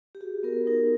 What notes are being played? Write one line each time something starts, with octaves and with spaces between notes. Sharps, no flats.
G4
F#4 G#4
B3 A#4
D#4 A#4